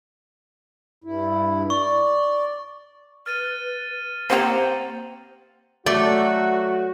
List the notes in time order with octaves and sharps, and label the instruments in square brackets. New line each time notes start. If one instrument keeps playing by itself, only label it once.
[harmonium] G2 E4
[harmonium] D5 [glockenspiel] C#6
[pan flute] B4 [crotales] F6 A6 D#7
[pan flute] A#3 [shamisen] C4 G4 G5 [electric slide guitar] C5 F#5 A#5
[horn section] F#3 F#4 [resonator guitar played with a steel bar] A3 [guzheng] D5